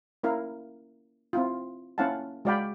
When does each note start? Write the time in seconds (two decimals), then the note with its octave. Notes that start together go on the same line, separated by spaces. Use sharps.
0.23 A#3 C#4 E4 A#4 F5
1.33 C4 E4 F4
1.98 A#3 C#4 E4 F5 F#5 A5
2.45 G#3 F#4 D5 F5 G5 B5